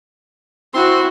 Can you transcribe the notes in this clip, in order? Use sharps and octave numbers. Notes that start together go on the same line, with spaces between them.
C4 E4 F#4 C6